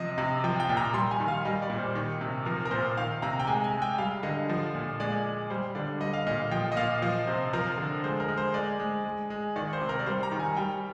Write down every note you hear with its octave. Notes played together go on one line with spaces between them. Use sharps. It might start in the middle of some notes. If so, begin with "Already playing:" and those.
Already playing: C3 F3 D#5
C3
F3 G5
G5
A#2
A#5
G3 C6
G#5
D#3
F5
G3 D#5
D5
A#2
C5
D#3
C3
F3 A#4
A#4
A#2 C5
D#3 F5
C3 A#5
G5
G#3 G#5
G#5
G#3
G5
G3 F5
D3 D#5
F3
A#2
G#3 D5
G#3
G3 C5
D3 D5
G3 D#5
F5
A#2 D#5
F3 G5
D#5
A#2 F5
F3 D#5
C3 C5
F3 A#4
D3
G#3 C5
A#4
G#3
C5
G#3 D5
G#3
G#3
G#3
D#3 D5
C5
C3
A#4
D5
G3 C5
A#5
D#3
G#5
G3 G5